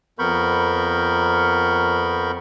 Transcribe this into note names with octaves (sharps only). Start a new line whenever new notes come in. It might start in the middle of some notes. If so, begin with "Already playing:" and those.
F2 B3 A#4 B5 C#6 G6